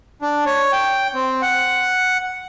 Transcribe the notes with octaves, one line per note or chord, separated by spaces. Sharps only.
D4
C#5
G5
C4
F#5